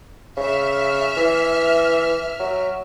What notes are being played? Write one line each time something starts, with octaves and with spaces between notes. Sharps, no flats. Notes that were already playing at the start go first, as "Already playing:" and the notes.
C#3 E5 F6
E3
F#3